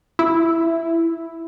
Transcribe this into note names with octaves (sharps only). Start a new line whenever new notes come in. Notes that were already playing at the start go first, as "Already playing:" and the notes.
E4